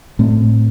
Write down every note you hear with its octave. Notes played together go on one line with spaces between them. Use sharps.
A2 A3 C4